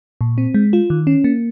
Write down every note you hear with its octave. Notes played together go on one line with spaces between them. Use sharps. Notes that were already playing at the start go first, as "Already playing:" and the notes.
A#2
C4
G#3
F4
D#3
C#4
A#3